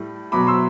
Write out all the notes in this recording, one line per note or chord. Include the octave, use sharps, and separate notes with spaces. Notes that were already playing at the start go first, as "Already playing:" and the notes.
Already playing: A2 G3
B2 F#3 B5 D6
C6 E6